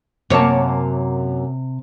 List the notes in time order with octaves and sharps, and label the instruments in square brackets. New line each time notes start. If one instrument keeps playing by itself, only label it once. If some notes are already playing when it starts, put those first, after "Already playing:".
[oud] F#2 A#3 C#5 [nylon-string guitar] C3 A5